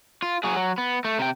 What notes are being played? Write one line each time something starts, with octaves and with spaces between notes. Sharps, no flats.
F4
F#3 G#4
F#3
B3
A3
C3 G5